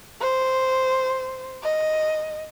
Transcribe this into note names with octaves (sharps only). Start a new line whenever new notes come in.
C5
D#5